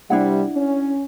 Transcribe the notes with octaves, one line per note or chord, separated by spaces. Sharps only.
C3 G3 D4 E4 F#5
C#4